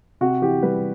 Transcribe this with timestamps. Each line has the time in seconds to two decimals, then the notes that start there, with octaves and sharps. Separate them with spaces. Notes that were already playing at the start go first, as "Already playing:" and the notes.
0.21 C3 F#4
0.42 E3 G4
0.63 G3 B4